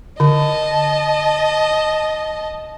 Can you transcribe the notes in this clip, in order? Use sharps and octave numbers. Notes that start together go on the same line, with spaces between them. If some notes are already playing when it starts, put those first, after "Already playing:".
D3 D#5 A5